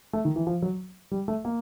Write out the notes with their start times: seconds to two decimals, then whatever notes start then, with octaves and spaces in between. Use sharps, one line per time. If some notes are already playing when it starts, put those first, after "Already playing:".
0.13 A3
0.25 D#3
0.36 E3
0.47 F3
0.62 F#3
1.11 G3
1.28 A3
1.45 A#3